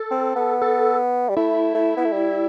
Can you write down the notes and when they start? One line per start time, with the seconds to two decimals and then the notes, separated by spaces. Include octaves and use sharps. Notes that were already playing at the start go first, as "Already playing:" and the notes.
Already playing: A4
0.11 C4
0.36 B3
0.62 A4
1.29 G3
1.36 A3 E4
1.75 A3
1.97 B3
2.05 A3
2.13 G3